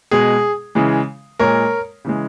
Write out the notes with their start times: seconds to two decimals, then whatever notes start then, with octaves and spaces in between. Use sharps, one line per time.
0.11 B2 G#3 G#4
0.75 C#3 E3 G#3
1.39 A#2 G#3 A#4 C#5
2.05 C#3 E3 G#3